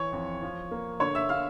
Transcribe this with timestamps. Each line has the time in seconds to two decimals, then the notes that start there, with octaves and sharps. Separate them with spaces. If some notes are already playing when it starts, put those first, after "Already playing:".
Already playing: E3 C#5 C#6
0.12 F2
0.42 F3
0.71 A#3
1.00 D3 C#5 C#6
1.15 E5 E6
1.29 D3 F5 F6